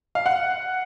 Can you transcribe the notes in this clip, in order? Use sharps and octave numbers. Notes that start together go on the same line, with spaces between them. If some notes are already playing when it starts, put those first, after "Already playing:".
F5
F#5